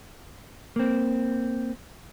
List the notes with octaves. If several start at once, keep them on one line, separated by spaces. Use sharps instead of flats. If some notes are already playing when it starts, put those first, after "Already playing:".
A#3 C4